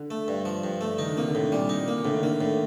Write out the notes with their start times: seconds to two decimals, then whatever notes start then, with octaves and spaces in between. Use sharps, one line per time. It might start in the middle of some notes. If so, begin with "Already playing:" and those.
Already playing: D3
0.11 A3
0.28 G2
0.45 F3
0.64 G2
0.81 A3
0.98 D#3 D#4
1.09 D3
1.17 C3 A#3
1.28 D3
1.35 A2
1.52 A#2 G3
1.69 D#4
1.88 A#3
2.05 A2 D3
2.14 D#3
2.23 D3 A#3
2.41 A2